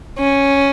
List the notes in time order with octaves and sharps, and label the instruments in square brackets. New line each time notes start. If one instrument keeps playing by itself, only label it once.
[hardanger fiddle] C#4